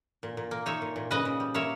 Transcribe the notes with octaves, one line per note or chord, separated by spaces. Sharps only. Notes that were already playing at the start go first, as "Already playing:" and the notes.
A#2
A#2
A#3
D#4 C#5 E5
A#2
A#2
C#3 B4 D#5
C#3
G3
A#3 C#5 E5